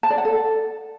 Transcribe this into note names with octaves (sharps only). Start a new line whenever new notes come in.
A5
D5
F#5
A4